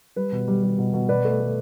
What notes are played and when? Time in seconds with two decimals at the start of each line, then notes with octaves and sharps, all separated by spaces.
0.16 G3 B4
0.32 B2
0.48 G3
0.63 G3
0.78 B2
0.93 B2
1.09 B2 B4 D5
1.25 A3
1.40 A3